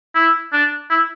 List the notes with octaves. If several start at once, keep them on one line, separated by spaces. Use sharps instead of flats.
E4
D4
E4